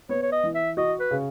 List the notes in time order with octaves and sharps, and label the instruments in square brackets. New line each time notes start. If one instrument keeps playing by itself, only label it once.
[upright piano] B3 [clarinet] C#5
[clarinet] C#5
D#5
[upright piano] E3
[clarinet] E5
[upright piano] F#4 [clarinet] D#5
[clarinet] B4
[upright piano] C#3